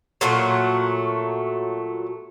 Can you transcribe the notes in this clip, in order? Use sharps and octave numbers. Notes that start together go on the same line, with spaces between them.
A#2 F#3 A3 F#4